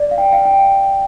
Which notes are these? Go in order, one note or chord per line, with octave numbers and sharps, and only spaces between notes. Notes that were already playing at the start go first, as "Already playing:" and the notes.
Already playing: D5
F5
G5
F5
G5